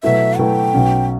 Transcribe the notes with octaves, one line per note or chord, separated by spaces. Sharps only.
B2 F#3 A3 E4 B4 E5
B2 F#3 A3 E4 B4 G5
B1 B2 F#3 C#4